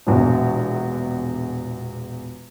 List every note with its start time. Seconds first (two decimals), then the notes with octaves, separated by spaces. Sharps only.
0.07 E1 A#1 E2